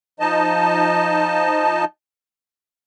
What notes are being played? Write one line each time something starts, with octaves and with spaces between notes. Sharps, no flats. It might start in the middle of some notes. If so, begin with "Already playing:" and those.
F3 D#4 D#5 A5